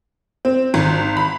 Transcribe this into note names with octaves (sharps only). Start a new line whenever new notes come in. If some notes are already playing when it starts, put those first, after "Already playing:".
C4
G#1
B5